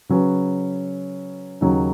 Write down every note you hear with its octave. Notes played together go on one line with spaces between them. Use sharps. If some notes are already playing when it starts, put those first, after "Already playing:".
C#3 F#3 C#4 B4
D#2 C#3 F#3 D#4